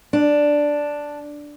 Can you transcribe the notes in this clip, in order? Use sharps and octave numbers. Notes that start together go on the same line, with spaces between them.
D4